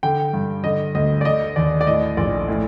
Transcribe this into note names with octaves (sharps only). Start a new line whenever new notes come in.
D3 G5
G2
D3 D#5
D2 D#5
D5
D3 D#5
D#2 D5
D5
A2 D#5
A#1 D5
A2